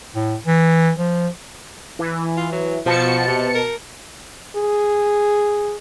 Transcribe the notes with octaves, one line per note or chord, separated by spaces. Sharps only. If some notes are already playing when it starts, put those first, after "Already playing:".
A2
E3
F3
E3
F4
F#3
B2 F3 A5 C#7
C3
A#4
G#4